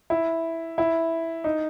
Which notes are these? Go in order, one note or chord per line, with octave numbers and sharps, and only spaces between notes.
E4
E4
D#4